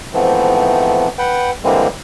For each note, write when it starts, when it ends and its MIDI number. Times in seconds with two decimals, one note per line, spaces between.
0.14 1.08 44
0.14 1.08 52
0.14 1.08 53
0.14 1.08 57
0.14 1.08 59
0.14 1.08 60
1.18 1.51 71
1.18 1.51 78
1.18 1.51 79
1.64 1.88 50
1.64 1.88 52
1.64 1.88 55
1.64 1.88 56
1.64 1.88 58
1.64 1.88 60